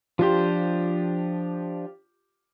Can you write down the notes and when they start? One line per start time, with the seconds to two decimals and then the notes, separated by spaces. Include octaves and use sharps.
0.19 F3 D4 F4 G4 C5